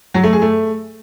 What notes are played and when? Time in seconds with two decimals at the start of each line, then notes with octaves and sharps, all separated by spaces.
0.14 F#3
0.24 A3
0.33 G#4
0.42 A3